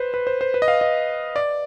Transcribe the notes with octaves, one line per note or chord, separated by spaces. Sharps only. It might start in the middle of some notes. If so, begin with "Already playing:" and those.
Already playing: B4 C5
B4
C5
C5
B4
D#5
F5
D#5
D5